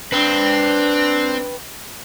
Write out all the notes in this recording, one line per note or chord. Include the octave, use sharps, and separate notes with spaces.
C4 D4 B4 G5